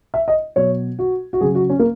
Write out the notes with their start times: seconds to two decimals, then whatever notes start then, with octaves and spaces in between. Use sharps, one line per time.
0.14 E5
0.28 D#5
0.56 B2 F#3 C#5
0.99 F#4
1.33 F#4
1.41 C#3 F#3 G#4
1.55 F#4
1.69 C#4
1.79 A#3